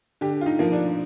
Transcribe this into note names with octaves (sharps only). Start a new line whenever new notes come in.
D3 G4
F4
D#4
F3 A#3
D4